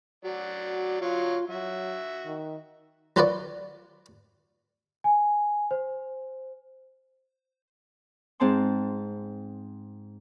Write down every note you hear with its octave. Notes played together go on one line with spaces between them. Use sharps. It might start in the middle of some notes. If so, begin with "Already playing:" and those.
F#3 F#4 D5
F#3 F4 C#5 F5
F#3 F#4 E5
D#3
F#3 F4 A#4 B4 C#5 D5
G#5
C5
G#2 C4 A5 C6